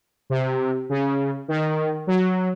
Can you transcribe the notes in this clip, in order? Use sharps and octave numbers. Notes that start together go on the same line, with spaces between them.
C3
C#3
D#3
F#3